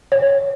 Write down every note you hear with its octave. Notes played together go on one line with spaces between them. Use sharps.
C#5